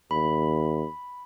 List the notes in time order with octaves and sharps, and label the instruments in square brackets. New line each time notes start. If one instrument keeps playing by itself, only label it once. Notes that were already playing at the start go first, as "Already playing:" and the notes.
[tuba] D#2 [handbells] B5